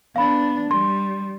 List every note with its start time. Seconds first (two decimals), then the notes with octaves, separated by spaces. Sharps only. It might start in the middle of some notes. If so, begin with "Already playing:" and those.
0.16 B3 D4 F5 B5
0.71 G3 C6